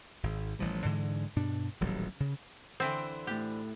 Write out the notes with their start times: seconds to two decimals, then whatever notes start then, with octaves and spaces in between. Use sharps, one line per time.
0.23 G#1
0.59 A1 E3 F3 G3
0.85 G#2 D3 E3 G#3
1.36 G2 B2 D4
1.81 D#1 A1 F#3 G3
2.20 C#3
2.80 D3 E3 C4 C5
3.27 A2 E4 G4 F#6